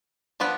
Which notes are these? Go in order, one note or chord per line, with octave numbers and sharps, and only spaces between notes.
F3 B3 D4 F4 B4